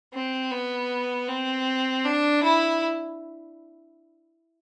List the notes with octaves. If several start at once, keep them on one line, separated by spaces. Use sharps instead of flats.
C4
B3
C4
D4
E4